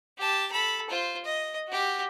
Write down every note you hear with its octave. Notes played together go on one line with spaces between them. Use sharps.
G4 A5
A4 B5
F4 C5
D#5
F#4 G4